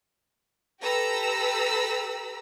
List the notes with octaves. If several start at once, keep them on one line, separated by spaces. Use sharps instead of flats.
G4 A4 B4 A#5 B5 E6